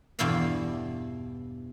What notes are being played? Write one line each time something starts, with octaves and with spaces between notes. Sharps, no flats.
E2 G2 B2 E4 D5 F5